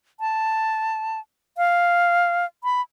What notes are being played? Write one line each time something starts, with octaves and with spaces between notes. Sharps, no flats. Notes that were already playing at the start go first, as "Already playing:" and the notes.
A5
F5
B5